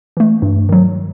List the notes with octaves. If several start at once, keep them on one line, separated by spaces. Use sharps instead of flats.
E3 A3
G2
D#3 F#3